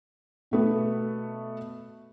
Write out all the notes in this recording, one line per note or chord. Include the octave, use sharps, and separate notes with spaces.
B2 A3 B3